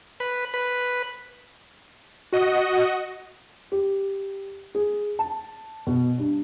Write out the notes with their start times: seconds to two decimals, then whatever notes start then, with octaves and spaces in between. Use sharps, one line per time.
0.20 B4
0.54 B4
2.33 F#4 D#5
3.72 G4
4.75 G#4
5.19 A5
5.87 B2
6.18 G2